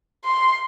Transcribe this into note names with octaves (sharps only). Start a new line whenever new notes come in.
C6